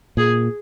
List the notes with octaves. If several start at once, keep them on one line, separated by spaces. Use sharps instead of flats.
A#2 G#4